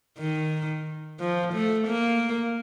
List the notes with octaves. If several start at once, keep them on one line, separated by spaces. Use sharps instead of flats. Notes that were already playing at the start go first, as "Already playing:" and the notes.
D#3
F3
A3
A#3